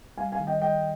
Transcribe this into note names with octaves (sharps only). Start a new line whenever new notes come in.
G3 F5 G#5
F5 G#5
D#3
D#5 G5
G3 D#5 G5